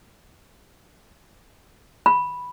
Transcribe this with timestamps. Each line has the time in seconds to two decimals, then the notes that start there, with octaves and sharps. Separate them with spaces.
2.06 B5